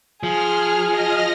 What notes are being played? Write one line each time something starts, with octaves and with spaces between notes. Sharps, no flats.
F3 G#4 F6
D#5 F6 A#6